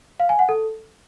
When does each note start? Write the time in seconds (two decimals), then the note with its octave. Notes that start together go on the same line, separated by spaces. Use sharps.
0.20 F5
0.29 G#5
0.39 F#5
0.49 A4